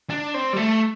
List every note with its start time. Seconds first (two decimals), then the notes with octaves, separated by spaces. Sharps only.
0.10 D4
0.34 C4
0.53 G3
0.57 A3